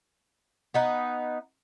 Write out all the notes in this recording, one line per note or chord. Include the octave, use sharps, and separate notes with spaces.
B3 D#4 B4